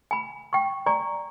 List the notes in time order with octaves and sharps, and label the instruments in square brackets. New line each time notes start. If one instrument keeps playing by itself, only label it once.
[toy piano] G#5 B5
G5 C#6
D5 G#5 A#5 C#6